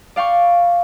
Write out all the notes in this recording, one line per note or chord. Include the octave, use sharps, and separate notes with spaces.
D5 F5 G5 C#6